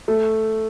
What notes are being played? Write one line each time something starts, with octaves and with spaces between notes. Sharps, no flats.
A3